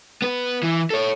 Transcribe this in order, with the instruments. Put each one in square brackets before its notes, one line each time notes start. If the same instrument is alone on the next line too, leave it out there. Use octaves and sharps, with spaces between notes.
[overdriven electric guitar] B3 B4
E3
A4 C#5